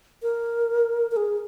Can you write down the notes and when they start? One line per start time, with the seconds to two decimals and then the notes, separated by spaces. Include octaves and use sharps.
0.23 A#4
1.11 A#4
1.17 G#4